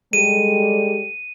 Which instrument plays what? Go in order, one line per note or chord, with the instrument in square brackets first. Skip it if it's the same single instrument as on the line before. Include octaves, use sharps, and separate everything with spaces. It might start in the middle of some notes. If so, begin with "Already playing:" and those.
[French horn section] G3 G4 A4 [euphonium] G#3 [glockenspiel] D#7